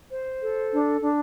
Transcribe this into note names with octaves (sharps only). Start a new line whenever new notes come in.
C5
A4
D4
D4